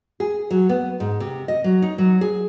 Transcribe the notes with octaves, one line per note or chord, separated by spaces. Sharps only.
G#4
F#3
B3
G#2
C3
D#5
F#3
D#4
F#3
G#4